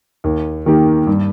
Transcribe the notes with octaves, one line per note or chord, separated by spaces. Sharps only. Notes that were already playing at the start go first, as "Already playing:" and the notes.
D#2
D#3 A#3 G4
G2